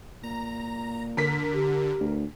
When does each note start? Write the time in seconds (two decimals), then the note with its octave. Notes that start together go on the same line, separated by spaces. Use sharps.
0.23 A#2 A#5
1.17 D3 A#4 B6
1.53 G4
2.00 D2